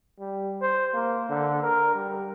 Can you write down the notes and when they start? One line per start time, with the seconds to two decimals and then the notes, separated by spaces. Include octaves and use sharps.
0.20 G3
0.62 C5
0.94 A#3
1.29 D3
1.63 A#4
1.95 G3